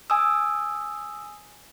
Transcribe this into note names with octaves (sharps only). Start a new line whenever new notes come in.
G#5 D#6 E6